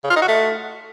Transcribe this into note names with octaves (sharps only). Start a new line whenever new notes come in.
C#3
F4
D#4
F#4
A3